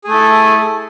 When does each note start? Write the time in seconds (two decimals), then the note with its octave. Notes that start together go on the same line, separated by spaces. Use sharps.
0.04 G#4
0.07 A3
0.10 A4
0.13 E4